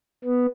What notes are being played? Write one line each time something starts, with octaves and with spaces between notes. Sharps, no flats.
B3